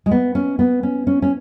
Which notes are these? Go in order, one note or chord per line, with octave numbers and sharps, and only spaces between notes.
G#3
B3
C#4
B3
C#4
C#4
C#4